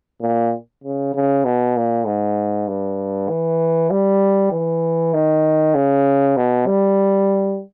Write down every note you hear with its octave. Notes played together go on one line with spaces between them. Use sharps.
A#2
C#3
C#3
B2
A#2
G#2
G2
E3
G3
E3
D#3
C#3
B2
G3